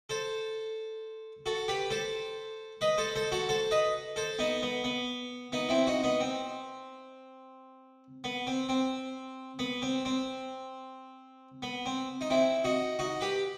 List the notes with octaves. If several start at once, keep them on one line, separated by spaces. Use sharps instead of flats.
A4 C5
F#4 A4
G4 B4
A4 C5
B4 D#5
A4 C5
A4 C5
F#4 A4
A4 C5
B4 D#5
A4 C5
B3 D#4
B3
B3
B3 D#4
C4 E4
D#4 F#4
B3 D#4
C4
B3
C4
C4
B3
C4
C4
B3
C4
D#4
C4 E4
D#4 F#4
D#4 F#4
G4 B4